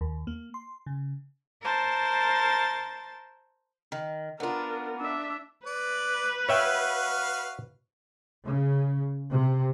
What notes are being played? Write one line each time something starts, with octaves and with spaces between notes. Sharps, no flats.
D#2
A#3
C6
C#3
A#4 C5 A5 A6
D#3
B3 D4 F4 A#4
D4 E5
B4 D5
F#4 C#5 E5 F5 G5
C#3
C3